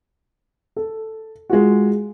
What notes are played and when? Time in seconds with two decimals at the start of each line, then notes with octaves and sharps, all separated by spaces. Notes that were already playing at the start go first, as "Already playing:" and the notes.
0.76 A4
1.50 G#3 F4 F#4